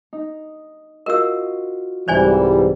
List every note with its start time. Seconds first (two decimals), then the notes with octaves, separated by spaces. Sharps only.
0.13 D#4
1.06 F4 F#4 A#4 D#5 E6
2.08 C2 G#2 E3 G3 C5 D5 G#5